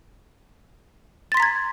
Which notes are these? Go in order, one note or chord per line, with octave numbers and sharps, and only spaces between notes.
A#5 C6 G#6 A6 B6